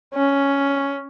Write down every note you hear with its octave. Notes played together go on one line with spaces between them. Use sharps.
C#4